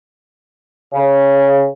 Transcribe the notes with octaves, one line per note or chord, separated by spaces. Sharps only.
C#3